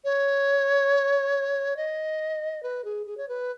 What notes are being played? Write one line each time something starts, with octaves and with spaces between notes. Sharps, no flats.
C#5
D#5
B4
G#4
G#4
C#5
B4